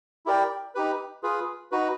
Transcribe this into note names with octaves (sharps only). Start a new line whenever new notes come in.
E4 G4 A#4 D5 G5
D#4 G4 B4
F4 G#4 B4
D#4 F#4 B4